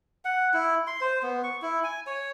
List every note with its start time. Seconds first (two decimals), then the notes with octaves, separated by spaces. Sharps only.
0.25 F#5
0.54 E4
0.87 C6
1.01 C5
1.23 B3
1.44 C#6
1.62 E4
1.84 G#5
2.07 C#5